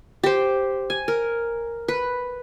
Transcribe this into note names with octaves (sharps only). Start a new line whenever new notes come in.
G4 C5
G#5
A#4
B4